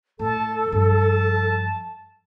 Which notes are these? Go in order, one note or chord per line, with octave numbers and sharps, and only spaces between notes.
A2 A4 A5
G2 F3 A5